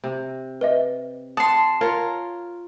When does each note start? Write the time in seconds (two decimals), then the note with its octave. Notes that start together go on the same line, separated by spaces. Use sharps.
0.04 C3
0.61 B4 D#5 E5
1.37 F#5 A5 C6 D#6
1.81 F4 A#4 C#5